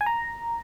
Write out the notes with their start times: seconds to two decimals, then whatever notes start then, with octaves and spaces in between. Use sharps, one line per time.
0.01 G#5
0.06 A#5